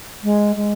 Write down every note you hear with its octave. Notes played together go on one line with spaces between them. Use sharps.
G#3
G#3